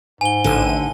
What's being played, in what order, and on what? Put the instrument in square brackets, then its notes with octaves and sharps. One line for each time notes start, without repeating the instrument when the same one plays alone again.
[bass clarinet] G#2 [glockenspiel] G#5 G7
[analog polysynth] A1 D#7 [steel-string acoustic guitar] D3